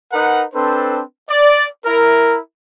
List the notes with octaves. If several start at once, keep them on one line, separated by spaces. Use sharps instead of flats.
D#4 A#4 B4 F#5
C4 D4 A4 B4 C5
D5
E4 A#4